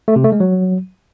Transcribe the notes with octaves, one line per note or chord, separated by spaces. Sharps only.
A3
C3
A3
G#3
F#3